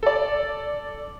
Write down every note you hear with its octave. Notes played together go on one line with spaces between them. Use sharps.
A4 D5